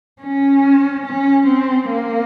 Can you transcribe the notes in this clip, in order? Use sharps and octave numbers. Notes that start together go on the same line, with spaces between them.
C#4
C#4
C4
A#3